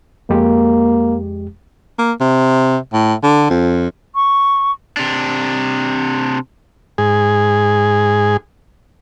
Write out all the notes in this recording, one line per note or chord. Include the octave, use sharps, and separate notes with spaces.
F2 G#3 A#3 G4
A#3
C3
A2
D3
F2
C#6
C3 D4
G#2 G#4